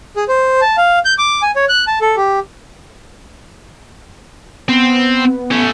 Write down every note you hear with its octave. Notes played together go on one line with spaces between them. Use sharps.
G#4
C5
A5
F5
G6
D6
G#5
C#5
F#6
A5
A4
G4
B3 C4
A3 C#4